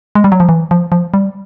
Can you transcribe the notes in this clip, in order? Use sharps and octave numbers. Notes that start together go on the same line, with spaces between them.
G#3
G3
F#3
F3
E3
F3
F3
G3